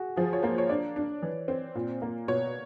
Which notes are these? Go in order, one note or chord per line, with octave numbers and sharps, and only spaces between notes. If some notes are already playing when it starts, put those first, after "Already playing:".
Already playing: F#4 G#4
F3 G#4
C#5
A#3 C5
C#5
D4 D5
D4
E3
C4
A#2
A#3
B2 C#5